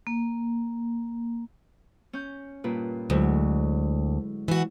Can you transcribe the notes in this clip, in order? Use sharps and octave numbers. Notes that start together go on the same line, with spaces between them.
A#3
C#4 G6
G2 A#2 B4
D2 F#3 G#3 E4
E3 F#4